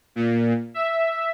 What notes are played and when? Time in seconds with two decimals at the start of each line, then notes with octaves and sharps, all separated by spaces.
0.16 A#2
0.74 E5